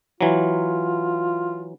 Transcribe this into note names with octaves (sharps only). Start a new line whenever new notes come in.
E3 F#3 F4